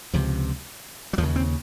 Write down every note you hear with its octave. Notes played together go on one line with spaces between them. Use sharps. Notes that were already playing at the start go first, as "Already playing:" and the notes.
C#2 C3 F3
F#3
D#2 F3
C#3
C4